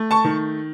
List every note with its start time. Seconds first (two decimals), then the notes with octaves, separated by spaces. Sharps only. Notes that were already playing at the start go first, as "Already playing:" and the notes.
Already playing: A3
0.11 A5 C#6
0.25 D#3